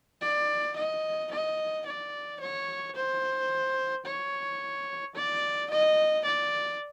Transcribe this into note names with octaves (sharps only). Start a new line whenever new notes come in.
D5
D#5
D#5
D5
C#5
C5
C#5
D5
D#5
D5